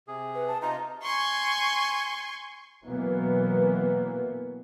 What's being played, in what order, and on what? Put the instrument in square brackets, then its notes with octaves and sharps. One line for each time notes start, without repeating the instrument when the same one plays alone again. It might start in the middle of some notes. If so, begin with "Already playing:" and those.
[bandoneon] C3 G#4
[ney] B4
A5
[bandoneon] C3 D#4 F4 [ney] A#5
[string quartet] G#5 C6 C#6
[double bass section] B2 E3 F#3 A#3 B3